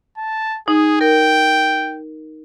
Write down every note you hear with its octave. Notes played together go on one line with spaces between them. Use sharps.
A5
D#4 G#4
A#4 G5